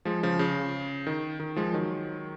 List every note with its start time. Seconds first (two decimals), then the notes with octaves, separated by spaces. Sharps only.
0.05 F3 G#3
0.23 C#3 F3
0.39 C#3
1.07 D#3
1.40 D#3
1.56 F3 G#3
1.73 D#3 F#3